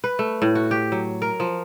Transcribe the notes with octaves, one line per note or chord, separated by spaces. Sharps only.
B4
A3
A2
F#4
G4
F#3
A#4
F3